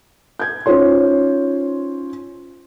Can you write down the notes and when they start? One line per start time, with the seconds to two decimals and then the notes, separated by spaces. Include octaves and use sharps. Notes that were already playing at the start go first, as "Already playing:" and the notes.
0.39 G6 G#6
0.66 C#4 D#4 F4 C5 C#5 C6